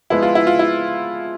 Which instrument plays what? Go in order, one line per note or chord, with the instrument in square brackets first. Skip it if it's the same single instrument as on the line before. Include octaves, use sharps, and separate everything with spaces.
[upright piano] F3 G#3 B3 [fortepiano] E4
[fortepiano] F4
E4
F4
E4